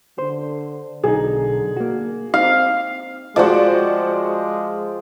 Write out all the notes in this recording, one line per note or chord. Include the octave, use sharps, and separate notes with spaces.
D3 C5
B1 D3 D#4 G#4
A#3 F#4
C4 D#4 F5
F3 G#3 F#4 G4 C5 D5